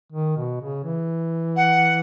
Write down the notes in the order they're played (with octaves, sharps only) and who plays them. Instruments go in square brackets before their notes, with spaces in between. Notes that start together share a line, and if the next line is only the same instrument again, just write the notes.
[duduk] D#3
B2
C#3
E3
[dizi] F#5